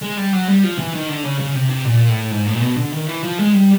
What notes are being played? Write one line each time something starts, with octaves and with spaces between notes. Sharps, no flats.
G#3
G3
F#3
G3
F3
E3
D#3
D3
C#3
C#3
C3
C3
A#2
A2
G#2
A2
A#2
B2
D3
D#3
E3
F3
G#3
G3